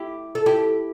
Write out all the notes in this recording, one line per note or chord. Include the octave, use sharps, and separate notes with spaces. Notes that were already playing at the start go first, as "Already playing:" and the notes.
Already playing: E4 G4
A4
E4 G4